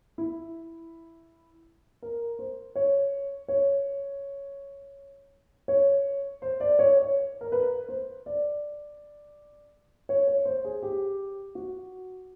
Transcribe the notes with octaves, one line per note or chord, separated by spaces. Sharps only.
E4
A#4
C5
C#5
C#5
C#5
C5
D5
C#5
C#5
A#4
B4
C5
D5
C#5
C#5
C5
G#4
G4
F#4